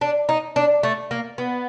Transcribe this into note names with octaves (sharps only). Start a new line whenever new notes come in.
D4
D#4
D4
A3
A#3
B3